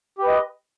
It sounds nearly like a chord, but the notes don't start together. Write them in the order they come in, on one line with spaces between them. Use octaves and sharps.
G4 B4 D#5